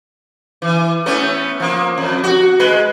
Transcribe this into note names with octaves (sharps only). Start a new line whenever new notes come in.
E3
A3 B3 C#4
F3 A#3
F2
F#4
G#3 B4